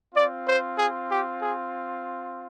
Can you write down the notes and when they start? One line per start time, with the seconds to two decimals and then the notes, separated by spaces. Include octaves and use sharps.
0.14 C4 F4 D5
0.47 C5
0.78 G#4
1.11 G4
1.42 G#4